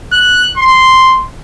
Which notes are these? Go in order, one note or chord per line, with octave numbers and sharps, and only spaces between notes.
F#6
C6